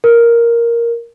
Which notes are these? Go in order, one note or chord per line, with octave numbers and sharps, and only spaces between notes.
A#4